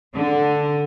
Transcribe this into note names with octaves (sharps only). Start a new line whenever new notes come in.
D3